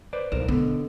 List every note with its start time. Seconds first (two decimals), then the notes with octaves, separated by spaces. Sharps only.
0.13 B4 C5 D5
0.32 B1 A#4 C5
0.48 B2 D3 B3